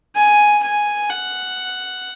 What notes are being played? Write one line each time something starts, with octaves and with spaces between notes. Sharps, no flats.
G#5
G#5
F#5